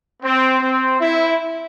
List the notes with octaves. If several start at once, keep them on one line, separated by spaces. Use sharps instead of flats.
C4
C4
E4